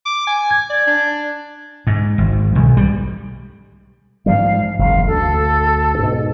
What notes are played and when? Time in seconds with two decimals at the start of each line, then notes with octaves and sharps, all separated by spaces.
0.05 D6
0.27 G#5
0.51 G#6
0.70 D5
0.87 D4
1.87 G#2
2.18 G#1
2.55 B1
2.77 G3
4.26 G#2 F3 G3 F5
4.79 F#1 E2 F5
5.07 D2 A4
5.99 G#2 B2